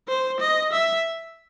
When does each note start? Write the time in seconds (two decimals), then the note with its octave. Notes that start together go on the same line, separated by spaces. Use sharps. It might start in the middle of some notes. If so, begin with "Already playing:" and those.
0.08 C5
0.40 D#5
0.73 E5